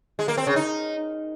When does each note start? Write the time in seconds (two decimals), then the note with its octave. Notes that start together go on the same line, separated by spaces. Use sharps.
0.19 G#3
0.28 A#3
0.37 C4
0.47 C#3
0.56 D#4